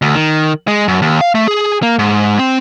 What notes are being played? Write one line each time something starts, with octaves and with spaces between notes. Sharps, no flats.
D2
D#3
G#3
F#2
D#2
F5
A3
G#4
A#3
G#2
C4